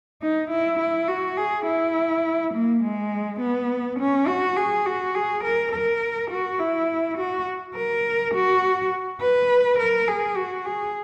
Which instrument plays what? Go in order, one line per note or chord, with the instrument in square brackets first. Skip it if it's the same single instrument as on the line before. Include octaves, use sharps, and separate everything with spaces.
[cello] D#4
E4
E4
F#4
G#4
E4
A#3
G#3
B3
C#4
F#4
G#4
F#4
G#4
A#4
A#4
F#4
E4
F#4
A#4
F#4
B4
A#4
G#4
F#4
G#4